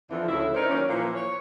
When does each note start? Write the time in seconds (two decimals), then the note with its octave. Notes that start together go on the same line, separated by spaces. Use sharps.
0.11 F2 D3 E3
0.29 D2 A2 C#3 E4
0.55 C#4 D#4 E4 A#4 C5 D5
0.69 D#3 F#3 A#3 C#4
0.89 A#2 E3 F3 A#3
1.15 C#5